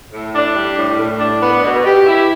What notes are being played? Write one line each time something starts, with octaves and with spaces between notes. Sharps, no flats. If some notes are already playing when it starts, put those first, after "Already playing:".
A2
D4
G3
A2
A2
D4
B3
B2
G4
E4